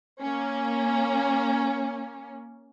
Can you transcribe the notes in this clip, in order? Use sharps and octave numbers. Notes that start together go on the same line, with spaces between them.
A#3 C#4